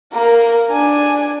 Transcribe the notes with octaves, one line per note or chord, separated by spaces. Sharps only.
A#3 A#4
D4 G#5